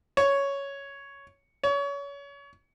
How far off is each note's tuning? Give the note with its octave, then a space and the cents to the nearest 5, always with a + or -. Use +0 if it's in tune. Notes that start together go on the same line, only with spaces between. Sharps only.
C#5 +5
C#5 +30